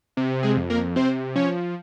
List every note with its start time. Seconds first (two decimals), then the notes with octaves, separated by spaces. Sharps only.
0.17 C3
0.43 G#3 G#4
0.57 F2
0.70 A#3 A#4
0.96 C3 C4 C5
1.35 F3 C#4 C#5